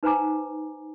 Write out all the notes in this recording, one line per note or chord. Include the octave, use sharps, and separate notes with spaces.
D#4 B4 C5 G#5 A#5 D6